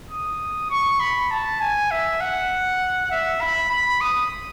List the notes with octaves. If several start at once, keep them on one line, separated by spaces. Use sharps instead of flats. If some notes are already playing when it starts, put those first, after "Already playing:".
D#6
C#6
B5
A5
G#5
E5
F#5
E5
B5
B5
D#6